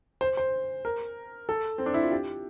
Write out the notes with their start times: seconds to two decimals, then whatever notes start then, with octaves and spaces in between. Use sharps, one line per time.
0.21 C5
0.37 C5
0.85 A#4
1.49 A4
1.78 C4
1.86 D4
1.94 E4
2.03 F4
2.12 G4